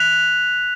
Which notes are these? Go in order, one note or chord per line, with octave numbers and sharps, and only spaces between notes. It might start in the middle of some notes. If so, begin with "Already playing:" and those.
Already playing: F#6 B6 F7